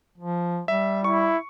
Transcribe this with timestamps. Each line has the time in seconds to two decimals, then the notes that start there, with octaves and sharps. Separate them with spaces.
0.18 F3
0.68 G3 E5
1.04 E4 C#6